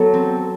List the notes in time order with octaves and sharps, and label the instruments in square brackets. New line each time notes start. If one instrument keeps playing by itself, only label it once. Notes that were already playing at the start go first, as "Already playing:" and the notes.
Already playing: [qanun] F#3 B3 [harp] A4
[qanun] C4